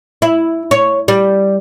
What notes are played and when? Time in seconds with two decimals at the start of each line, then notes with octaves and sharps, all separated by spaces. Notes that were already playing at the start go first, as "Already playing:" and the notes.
0.22 E4
0.71 C#5
1.08 G3